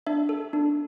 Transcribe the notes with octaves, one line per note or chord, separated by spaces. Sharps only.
D4 E5
A4
D4